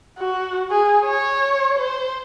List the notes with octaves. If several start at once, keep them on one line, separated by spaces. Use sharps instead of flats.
F#4
G#4
C#5
C5